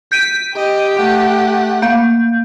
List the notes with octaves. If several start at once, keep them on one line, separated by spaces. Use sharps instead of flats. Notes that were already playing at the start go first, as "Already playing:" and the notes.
G6 B6 D7 D#7
G4 D#5
A3 F#5
A#3 F5 G6